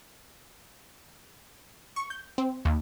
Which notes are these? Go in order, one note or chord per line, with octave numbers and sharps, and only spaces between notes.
C#6
G6
C4
D#2